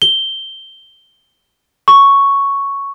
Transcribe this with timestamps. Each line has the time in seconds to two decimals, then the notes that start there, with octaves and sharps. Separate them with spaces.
0.02 G7
1.88 C#6